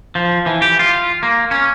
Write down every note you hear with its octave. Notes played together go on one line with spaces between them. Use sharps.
F3
E3
G4
F4
A#3
C#4